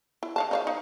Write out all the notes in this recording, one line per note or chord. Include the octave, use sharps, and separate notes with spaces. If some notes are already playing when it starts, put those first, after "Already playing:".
E4
D#3 F5 A5
D#4 C#5 F5
D#4